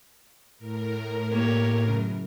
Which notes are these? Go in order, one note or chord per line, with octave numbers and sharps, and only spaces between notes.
A2 A#4
A#3 G4 C#5
F#2 C#3